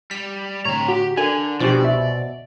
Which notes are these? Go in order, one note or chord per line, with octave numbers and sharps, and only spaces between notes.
G3 B6
A2 D3 C4 C#5 A#5
F#4 G4
D3 D4 A4 A#4 G#5
B2 F3 D4 G4 C5 D5 G#5 C#6
C2 E5